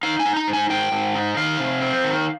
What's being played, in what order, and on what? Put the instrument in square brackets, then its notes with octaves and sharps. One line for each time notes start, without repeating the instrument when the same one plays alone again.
[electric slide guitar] D#4 F5
G#5
D#4
A#5
G#2
G#5
G#2 G5
G#2
D#4
D#3 F5
C3
C4
D#3